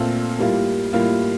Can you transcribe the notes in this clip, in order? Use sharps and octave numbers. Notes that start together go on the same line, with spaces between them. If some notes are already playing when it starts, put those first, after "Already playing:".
Already playing: A#2 A3 C4 F4 A4
A2 G3 A#3 F4
A2 G3 A#3 F4